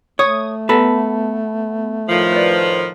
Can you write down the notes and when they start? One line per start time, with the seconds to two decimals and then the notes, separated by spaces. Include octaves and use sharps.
0.19 A3 C#5 D#6
0.69 B3 A4 B4
2.09 A2 D#3 F3 F5
2.32 B4 D5